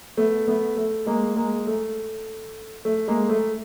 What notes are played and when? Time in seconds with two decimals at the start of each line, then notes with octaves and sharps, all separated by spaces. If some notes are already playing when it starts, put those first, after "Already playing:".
0.17 A3 B3
0.48 A3 B3
0.77 A3
1.06 G#3 A#3
1.36 G#3 A#3
1.67 A3
2.85 A3
3.08 G#3 A#3
3.29 A3